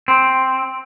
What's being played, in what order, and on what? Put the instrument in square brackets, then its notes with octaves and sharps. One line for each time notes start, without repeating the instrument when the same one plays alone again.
[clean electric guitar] C4